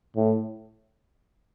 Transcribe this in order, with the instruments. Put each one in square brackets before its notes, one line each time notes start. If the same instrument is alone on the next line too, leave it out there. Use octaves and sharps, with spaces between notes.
[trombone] A2